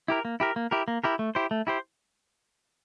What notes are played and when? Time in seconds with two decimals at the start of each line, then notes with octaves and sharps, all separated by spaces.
0.08 E4 G4 A#4
0.25 A#3
0.40 E4 G4 A#4
0.56 A#3
0.71 E4 G4 A#4
0.88 A#3
1.04 E4 G4 A#4
1.19 A3
1.35 E4 G4 C5
1.51 A3
1.67 E4 G4 C5